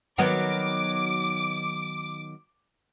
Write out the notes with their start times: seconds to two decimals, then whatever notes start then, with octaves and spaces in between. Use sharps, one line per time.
0.18 D#3 F#3 B3 D6